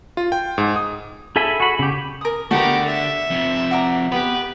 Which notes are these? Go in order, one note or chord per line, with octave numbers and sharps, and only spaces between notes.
F4
G5
G#2
D#6
G#4 A4 E5 G#5 B5
F#4 B5
C#3 G4
A#4 D#6
D3 A3 B3 F#4 G4 A#4
E5
F2 C3
F#4 D5 A#5
B3 G4 B4